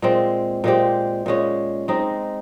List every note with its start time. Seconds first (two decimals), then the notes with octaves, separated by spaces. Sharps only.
0.02 A#2 G#3 C4
0.64 A#2 G#3 C4 G4
1.26 A#2 G#3 C#4
1.88 G#3 C4 D#4